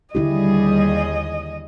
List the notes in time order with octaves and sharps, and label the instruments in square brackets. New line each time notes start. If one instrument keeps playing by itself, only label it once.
[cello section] D#2 G3 G#4 [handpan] D3 E4 G4 [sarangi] D#5